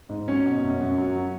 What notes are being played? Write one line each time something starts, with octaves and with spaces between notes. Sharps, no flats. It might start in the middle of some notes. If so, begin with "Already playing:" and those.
G#2
F#3 C#4
B2
F#2
F#2
F#3
F#3